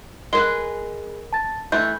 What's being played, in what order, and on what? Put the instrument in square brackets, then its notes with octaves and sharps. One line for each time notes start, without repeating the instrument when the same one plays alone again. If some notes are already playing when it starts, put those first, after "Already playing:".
[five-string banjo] G#3 G#4 B4 [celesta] A#4 G7
[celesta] A5 A6
[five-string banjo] E3 A3 [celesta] G6